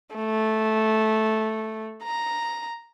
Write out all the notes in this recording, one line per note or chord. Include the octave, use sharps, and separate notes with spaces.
A3
A#5